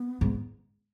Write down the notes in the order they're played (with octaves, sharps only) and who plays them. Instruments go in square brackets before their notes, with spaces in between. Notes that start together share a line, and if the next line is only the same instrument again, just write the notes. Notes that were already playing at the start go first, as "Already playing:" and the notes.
Already playing: [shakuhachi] B3
[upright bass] G#2